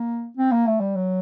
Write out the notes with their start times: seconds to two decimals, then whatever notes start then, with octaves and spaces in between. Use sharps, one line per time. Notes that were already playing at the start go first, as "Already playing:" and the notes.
Already playing: A#3
0.37 C4
0.52 A#3
0.67 A3
0.80 G3
0.96 F#3